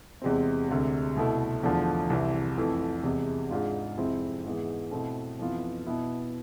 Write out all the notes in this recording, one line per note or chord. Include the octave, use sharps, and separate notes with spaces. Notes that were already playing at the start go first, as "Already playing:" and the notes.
E2 C3 G#3 C4
D2 C3 G#3
C2 B2 A3 E4
E2 D3 F3 A3
C2 C3 E3
F2 E3 A3
E2 C3 G#3
G#2 G#3 D4 F4
F2 C3 G#3 C4 E4
G#2 E3 G#3 B3 E4
B2 A3 C4 E4
F2 E3 B3 F4
B2 B3 E4